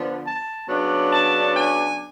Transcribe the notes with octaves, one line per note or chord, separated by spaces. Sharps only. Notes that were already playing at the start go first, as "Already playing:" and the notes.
Already playing: D3 F3 B3 D4
A5
C#3 F#3 B3 D4
A5
G#5